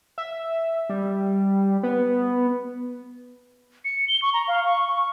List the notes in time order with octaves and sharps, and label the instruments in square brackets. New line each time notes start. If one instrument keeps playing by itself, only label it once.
[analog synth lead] E5
G3
B3
[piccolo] C#7
G7
C#6
A#5
F5
C#6
C#6